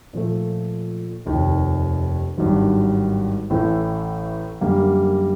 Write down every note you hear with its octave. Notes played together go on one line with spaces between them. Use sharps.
A#2 F3 A3
F1 D#2 D#3
G#1 G2 D#3 F#3
A1 A2 E3 A3
F#2 D3 G3 A#3